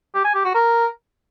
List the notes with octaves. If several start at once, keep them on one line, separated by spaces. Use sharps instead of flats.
G4
G#5
G4
F#4
A#4